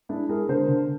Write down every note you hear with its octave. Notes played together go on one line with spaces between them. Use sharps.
G#3 D4 E4
G#3 G#4 A#4
D3 A#4 C5
D3